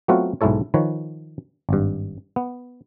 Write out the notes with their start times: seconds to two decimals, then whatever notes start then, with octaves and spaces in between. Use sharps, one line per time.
0.08 F#3 A3 B3 C4 F4 F#4
0.41 B1 G#2 G#3 E4 A4 C#5
0.74 D#3 F3 B4 C#5
1.69 G#1 G2
2.36 B3